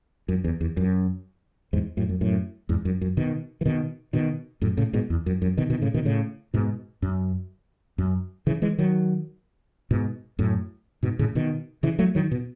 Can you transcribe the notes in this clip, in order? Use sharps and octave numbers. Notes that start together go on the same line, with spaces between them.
F#2
E2
E2
F#2
E2 G#2
F#2 A2
F#2
F#2 A2
E2 G#2
F#2
F#2
B2 D#3
E3
B2 D#3
B2 D#3
F#2 A2
A2 C#3
G#2 B2
E2
F#2
F#2
B2 D#3
B2 D#3
A2 C#3
B2 D#3
A2 C#3
G#2 B2
F#2
F#2
C#3 E3
E3 G#3
D#3 F#3
G#2 B2
F#2 A2
G#2 B2
A2 C#3
B2 D#3
C#3 E3
F#3 A3
D#3 F#3
B2